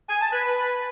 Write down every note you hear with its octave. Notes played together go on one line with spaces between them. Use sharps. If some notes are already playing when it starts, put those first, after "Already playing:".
G#5
A5
B4